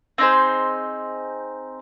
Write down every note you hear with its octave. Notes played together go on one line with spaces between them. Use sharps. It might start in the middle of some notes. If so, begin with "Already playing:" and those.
C4 D#4 G#4 C5